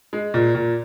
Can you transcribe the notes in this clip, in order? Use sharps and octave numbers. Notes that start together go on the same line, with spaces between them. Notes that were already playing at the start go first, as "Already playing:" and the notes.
G#3
A#2
A#2